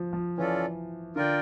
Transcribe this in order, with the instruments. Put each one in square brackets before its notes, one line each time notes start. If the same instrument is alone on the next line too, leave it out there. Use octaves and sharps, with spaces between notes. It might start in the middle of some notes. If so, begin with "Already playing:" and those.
Already playing: [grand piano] F3
F3
[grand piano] E3 [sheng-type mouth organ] C#4 F4 A4 D5
[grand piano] D3 [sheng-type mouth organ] F4 A#4 D5 G5